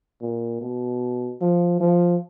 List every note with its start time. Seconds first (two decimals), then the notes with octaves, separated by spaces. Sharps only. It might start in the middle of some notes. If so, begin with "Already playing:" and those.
0.22 A#2
0.61 B2
1.41 F3
1.80 F3